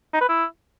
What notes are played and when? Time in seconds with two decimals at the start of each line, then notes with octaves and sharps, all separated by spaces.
0.13 D#4
0.21 B4
0.29 E4